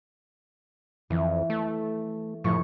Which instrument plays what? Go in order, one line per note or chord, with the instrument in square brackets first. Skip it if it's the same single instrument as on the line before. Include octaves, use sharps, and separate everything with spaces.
[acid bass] F2 [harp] E3
[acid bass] A3
[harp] F#1 F3 C#6 [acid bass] A2